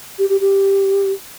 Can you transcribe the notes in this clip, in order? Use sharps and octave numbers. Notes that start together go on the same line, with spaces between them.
G4
G4
G4